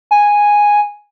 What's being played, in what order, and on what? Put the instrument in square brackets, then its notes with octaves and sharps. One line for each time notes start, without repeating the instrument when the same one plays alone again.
[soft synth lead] G#5